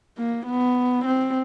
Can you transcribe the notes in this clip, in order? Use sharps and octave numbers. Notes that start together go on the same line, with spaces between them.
A#3
B3
C4